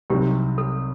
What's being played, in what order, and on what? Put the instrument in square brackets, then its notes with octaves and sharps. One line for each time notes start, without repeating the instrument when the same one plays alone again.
[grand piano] C2 C3 F#3 C4 D#4 [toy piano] G4
[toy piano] A4